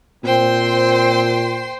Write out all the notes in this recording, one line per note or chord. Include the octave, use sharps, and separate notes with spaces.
A#2 C4 C5 G5 C6